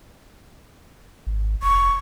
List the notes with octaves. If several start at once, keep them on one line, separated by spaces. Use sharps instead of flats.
G#1
F1 C#6